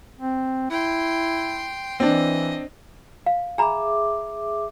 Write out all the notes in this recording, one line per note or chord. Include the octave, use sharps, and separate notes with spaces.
C4
E4 G5 C6
E3 C4 D4 D#5
F5
G#4 E5 G#5 A#5 B5 D6